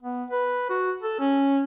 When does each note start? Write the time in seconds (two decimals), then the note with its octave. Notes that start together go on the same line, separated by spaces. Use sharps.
0.02 B3
0.31 B4
0.70 F#4
1.03 A4
1.20 C#4